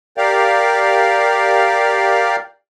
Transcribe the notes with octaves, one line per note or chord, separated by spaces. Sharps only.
G4 A#4 D5 F5